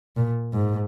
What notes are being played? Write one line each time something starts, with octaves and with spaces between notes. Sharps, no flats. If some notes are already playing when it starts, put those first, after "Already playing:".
A#2
G#2